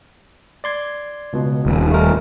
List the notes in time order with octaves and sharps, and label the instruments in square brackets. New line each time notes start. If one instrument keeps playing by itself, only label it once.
[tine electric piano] D5 C6 G#6
C#2 B2
[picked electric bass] D#1
[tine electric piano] A3 F4 A#4